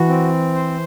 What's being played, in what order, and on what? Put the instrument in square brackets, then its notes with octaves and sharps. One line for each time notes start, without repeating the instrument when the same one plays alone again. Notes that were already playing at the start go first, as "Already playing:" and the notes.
Already playing: [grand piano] E3 [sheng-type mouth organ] F#4
[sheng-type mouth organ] C4
C5